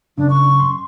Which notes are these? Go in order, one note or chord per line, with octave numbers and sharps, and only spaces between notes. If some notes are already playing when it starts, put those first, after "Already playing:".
F#2 C#3 D4
C#6
C6